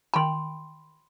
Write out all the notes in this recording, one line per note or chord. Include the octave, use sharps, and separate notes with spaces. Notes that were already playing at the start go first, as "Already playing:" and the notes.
D#3 G5 B5 C6